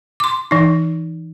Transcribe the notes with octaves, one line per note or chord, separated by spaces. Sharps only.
C6 D6
E3 D#4